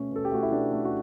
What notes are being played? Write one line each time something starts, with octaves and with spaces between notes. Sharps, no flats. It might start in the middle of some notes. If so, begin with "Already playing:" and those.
Already playing: B2 A3 C#4
B2 A4
G4
A3 F#4
E4
B2 D4
A3
F#4